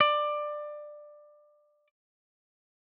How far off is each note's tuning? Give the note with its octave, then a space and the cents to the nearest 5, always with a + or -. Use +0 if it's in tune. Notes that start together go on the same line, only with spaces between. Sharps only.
D5 +20